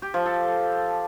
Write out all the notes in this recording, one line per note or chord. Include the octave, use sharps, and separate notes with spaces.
G4
F3
A4